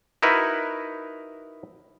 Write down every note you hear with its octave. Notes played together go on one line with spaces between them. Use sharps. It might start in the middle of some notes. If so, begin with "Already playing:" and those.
D#4 E4 F#4 A#4 B4